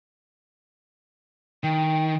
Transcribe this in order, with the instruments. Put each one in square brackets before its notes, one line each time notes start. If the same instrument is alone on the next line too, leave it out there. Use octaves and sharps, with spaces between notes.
[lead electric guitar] D#3 [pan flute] G5